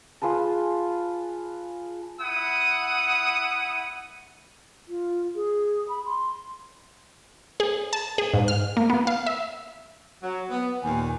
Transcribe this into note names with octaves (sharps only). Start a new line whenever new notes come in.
F4 G#4 B4 A5
E4 F#5 D#6
F4
G#4
B5
C6
G#4
A5
G#4
G#2
F6
A#3
B3
F5
E5
F#3
B3
D#2 A#2 G#5